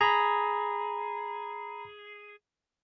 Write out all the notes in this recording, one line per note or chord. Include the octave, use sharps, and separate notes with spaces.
G#4 A#5 B5